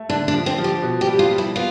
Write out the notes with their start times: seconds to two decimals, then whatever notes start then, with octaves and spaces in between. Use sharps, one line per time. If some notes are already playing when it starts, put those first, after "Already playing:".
Already playing: A3
0.09 D3 D4
0.28 D4
0.34 F3
0.46 C4
0.58 F3
0.64 G4
0.83 B2
1.01 G4
1.07 G3
1.19 F4
1.31 G3
1.38 E4
1.56 B3 F4